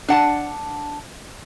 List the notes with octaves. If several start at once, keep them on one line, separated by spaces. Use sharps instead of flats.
D4 F#5 A5